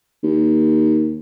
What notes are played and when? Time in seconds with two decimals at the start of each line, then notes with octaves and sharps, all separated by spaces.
0.24 D#2